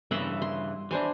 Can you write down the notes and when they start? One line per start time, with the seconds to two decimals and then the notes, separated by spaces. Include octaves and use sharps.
0.11 G2 C#3 E3 E5 F#5 C6
0.42 C6
0.91 E3 D4 C5 G#5